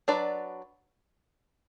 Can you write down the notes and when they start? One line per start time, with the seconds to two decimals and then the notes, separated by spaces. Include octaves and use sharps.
0.08 F#3 D4 B4 D5